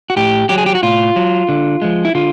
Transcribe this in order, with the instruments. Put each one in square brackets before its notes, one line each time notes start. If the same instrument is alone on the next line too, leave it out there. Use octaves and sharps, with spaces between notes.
[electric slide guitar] F#4
A2 G4
F#3 G4
G#4
G4
F#4
A2 F4
F#3
D3
F3 G#3
E4
D3 F4